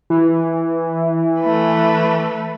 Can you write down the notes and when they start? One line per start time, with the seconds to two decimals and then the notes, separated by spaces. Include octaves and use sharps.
0.10 E3
1.41 A3 B4